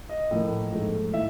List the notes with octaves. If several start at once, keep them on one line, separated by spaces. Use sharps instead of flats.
D#5
A2 F3 A#3
G#2 F3 A3
A2 E3 E5